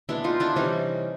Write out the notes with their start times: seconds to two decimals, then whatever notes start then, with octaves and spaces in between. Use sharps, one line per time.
0.09 B2 G#3 B3 D4 E4
0.24 D#4 F4
0.40 D4 E4
0.56 C3 E3 G3 C#4 D#4